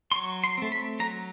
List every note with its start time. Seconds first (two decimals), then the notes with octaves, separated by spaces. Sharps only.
0.12 C6
0.16 F#3 C#6
0.44 C6
0.58 A3 C4
0.72 B5
0.99 F#3 A#5